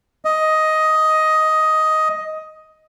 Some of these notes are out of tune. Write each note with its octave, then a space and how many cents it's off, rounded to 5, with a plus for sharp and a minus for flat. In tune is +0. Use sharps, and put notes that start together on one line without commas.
D#5 +10